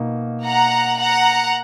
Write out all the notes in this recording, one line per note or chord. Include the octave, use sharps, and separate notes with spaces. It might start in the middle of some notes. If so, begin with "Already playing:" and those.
Already playing: B2 A#3 D#4
F#5 A#5
F#5 A#5